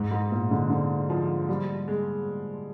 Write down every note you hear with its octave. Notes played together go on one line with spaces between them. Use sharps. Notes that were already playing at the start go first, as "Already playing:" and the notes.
Already playing: G#2
G#2
A#2
D3
D3
F3
G3
G#3